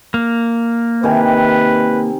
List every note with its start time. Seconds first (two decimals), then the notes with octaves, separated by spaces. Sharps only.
0.14 A#3
1.03 C3 D#3 B4 G#5